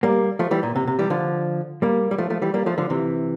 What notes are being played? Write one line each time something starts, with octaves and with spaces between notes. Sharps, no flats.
G3 A#3
F3 A3
E3 G3
A#2
C3
C3
E3 G3
D3 F3
G3 A#3
G3
F3 A3
F3 A3
E3 G3
G3 A#3
F3 A3
D3 F3
C3 E3